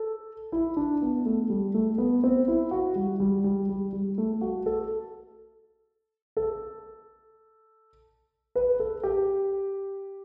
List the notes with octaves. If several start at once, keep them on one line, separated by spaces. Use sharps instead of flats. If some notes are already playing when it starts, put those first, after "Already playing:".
Already playing: A4
E4
D4
B3
A3
G3
A3
B3
C4
E4
F#4
G3
G3
G3
G3
G3
A3
F#4
A4
A4
B4
A4
G4